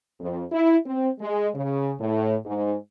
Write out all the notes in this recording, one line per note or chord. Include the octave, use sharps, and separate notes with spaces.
F2
E4
C4
G#3
C#3
A2
G#2